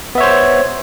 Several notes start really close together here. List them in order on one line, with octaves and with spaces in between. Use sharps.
B3 E5 C#5 C5